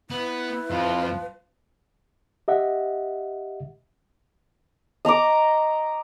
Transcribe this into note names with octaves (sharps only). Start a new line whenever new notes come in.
B3 E4 B4
F2 F3
G4 D#5 E5 F#5
D#5 A#5 C#6 D6